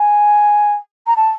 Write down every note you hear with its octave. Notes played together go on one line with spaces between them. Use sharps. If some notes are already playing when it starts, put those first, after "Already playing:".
Already playing: G#5
A#5
A5